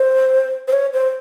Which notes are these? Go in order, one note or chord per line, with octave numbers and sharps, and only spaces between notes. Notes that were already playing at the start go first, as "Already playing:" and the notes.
Already playing: C5
C5
C#5
C5